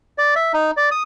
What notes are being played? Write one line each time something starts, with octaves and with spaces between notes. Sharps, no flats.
D5
E5
D#4
D5
D#6